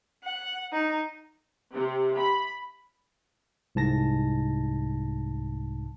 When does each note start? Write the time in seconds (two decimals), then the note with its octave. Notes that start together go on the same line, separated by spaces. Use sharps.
0.23 F#5
0.72 D#4
1.73 C3
2.17 B5
3.75 C2 G#2 A5 A#6